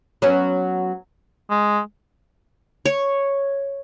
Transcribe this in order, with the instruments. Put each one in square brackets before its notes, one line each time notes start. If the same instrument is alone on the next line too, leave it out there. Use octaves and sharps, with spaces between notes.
[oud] F#3 B3 C#4
[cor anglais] G#3
[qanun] C#5